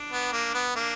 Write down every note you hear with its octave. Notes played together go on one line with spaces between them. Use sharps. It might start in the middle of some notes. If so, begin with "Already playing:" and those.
Already playing: D4
B3
A#3
B3
A#3 D4